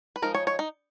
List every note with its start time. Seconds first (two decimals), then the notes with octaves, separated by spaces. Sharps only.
0.16 B4
0.22 F3 G#3 D#4 A#4
0.34 C#5
0.47 C#5
0.59 D#4